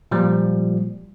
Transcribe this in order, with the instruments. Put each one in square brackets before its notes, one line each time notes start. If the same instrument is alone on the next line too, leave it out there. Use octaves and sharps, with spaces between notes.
[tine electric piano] A#2 F3 G3